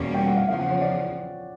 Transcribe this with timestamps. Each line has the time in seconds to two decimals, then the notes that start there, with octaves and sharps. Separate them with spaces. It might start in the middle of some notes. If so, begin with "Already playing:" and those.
Already playing: E2 B2 G3 A#3 C#4
0.14 G5
0.26 F#5
0.37 F5
0.48 E2 C#3 F3 F5
0.59 F#5
0.71 C#5
0.82 D5